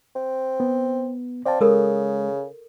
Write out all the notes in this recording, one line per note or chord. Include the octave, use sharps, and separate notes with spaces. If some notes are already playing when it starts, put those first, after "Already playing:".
C4
B3
C4 D5 F5 A5
C#3 G#3 A4 A#4 D#6